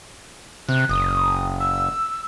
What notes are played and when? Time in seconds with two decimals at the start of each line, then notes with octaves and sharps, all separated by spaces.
0.69 C3 F#6
0.89 F#1 D#6
1.60 E6